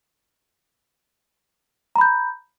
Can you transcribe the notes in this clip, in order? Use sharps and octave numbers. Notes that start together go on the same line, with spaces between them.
A#5 B5 G6